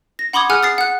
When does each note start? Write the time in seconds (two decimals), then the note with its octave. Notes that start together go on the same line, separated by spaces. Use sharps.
0.19 A#6
0.33 F#5 B5 C6 D6 D#6 G#6
0.49 G#4 F#5 G#5 F6 F#6
0.63 D#6 A6 C7
0.78 F#5 F#6